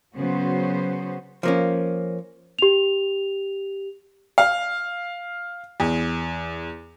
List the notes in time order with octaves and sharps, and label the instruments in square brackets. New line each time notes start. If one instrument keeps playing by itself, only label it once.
[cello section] C#3 F#3 B3 F#4 C5
[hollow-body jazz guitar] F3 A#3 C#4
[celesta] G4 F7
[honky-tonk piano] F5
E2